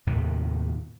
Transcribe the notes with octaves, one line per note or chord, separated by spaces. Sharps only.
D#2 A2 C3 D#3